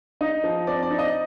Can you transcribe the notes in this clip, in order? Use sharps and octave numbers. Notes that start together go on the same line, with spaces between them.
D#4 D#5
F3
C4 D5
D5
D#4
D#5